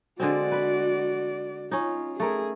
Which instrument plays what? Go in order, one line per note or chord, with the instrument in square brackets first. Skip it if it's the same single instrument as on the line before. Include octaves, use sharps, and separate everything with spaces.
[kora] D3 G#3 C4 [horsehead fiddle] F#4 D5
[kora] B4
[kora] C#4 D#4 [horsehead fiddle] F4
[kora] A3 A#4 [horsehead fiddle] G#4